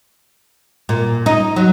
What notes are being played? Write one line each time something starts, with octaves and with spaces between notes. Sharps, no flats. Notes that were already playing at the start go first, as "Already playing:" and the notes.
A#2
D#4
F#3